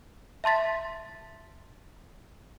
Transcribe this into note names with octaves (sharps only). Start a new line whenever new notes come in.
E5 A5 C6 A6 B6